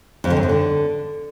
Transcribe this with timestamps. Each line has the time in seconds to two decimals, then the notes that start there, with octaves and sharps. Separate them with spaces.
0.24 F2
0.30 D3
0.37 F#2
0.43 F2
0.49 D3